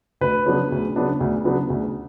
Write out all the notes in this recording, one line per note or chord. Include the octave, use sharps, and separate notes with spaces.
D2 B4
C#3 F#3 B3 D4
D2
C#3 F#3 B3 D4
D2
C#3 F#3 B3 D4
D2